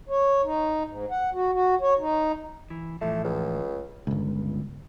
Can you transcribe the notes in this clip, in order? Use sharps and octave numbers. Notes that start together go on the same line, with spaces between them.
C#5
D#4
G#2
F#5
F#4
F#4
C#5
D#4
E3
A2 E3 F3 A3
C#2
G1 C#2